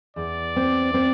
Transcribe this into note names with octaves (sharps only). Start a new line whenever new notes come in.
E2 D5
C4
C4